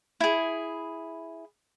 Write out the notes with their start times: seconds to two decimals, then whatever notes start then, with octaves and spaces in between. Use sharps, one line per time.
0.20 E4 G#4